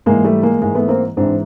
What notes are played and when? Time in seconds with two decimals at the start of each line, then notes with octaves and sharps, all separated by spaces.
0.06 G#2 E3 G#3 A#3
0.24 G3 A3
0.43 G#3 A#3
0.61 G#2 E3 G#3 A#3
0.75 A3 B3
0.89 A#3 C4
1.17 G#2 E3 C4 D4